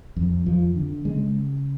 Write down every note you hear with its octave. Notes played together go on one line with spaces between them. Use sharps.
F2
F2 F3
D3
C#3 G#3